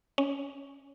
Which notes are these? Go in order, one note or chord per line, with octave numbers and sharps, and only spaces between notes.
C#4